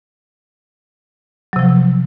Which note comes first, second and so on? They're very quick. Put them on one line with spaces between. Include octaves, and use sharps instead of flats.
F#3 C3 F3